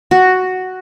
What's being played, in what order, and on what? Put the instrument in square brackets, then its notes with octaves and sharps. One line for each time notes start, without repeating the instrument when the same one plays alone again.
[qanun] F#4